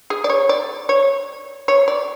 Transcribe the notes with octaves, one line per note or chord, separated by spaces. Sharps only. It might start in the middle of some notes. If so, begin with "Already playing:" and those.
G#4
D5
C#5
D5
C#5
C#5
D5